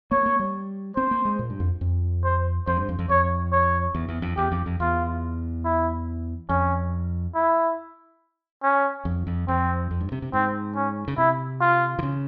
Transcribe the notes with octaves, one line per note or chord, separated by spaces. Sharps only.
A#3 C#5
A#3
G3
C4 C5
A#3
G#3
A#2
G2
F2
F2
C5
F2 C5
G2
F2
F2
F2 C#5
C#5
E2
E2
F2
E2 G4
F2
F2
E2 F4
E4
F2 C#4
E4
C#4
F2
F2
F2 C4
F2
G2
C3
C3
G#2 C4
C#4
C#3
C3 E4
F4
E3
C#3